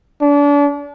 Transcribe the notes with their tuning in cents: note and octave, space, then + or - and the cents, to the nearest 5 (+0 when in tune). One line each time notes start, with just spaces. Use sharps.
D4 -35